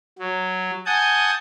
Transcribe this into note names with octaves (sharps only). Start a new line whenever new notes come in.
F#3
F#5 G#5 A5 D#6 G6